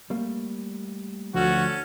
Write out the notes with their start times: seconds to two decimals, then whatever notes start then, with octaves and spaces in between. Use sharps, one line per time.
0.10 G3 A3 A#3
1.34 D2 F3 C#4 F#4 A4